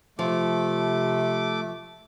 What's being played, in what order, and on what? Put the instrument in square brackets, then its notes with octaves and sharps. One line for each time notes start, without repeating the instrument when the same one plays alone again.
[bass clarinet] C3 [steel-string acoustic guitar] F3 [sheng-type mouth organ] A3 D6